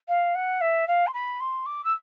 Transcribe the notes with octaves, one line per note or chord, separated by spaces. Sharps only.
F5
F#5
E5
F5
C6
B5
C6
D6
E6